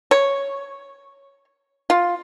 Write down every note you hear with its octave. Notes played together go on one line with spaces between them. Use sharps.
C#5
F4